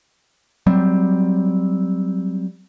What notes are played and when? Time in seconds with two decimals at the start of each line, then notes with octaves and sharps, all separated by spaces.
0.67 F#3 G3 C4